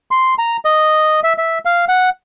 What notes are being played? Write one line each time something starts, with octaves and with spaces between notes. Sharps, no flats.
C6
A#5
D#5
E5
E5
F5
F#5